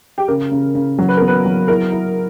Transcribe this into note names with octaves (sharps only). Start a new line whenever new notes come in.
G4
C#3 A#4
C#3
C#3
F#3
B4
B3 A#4
B4
F#3
E4 A#4
E4